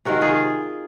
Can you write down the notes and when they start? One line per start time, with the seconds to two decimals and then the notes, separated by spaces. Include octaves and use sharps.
0.05 C3 D#3 G#3 F#4 A#4
0.21 F4 G#4